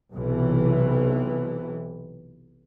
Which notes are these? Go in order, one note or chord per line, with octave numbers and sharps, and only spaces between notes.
B1 C3 E3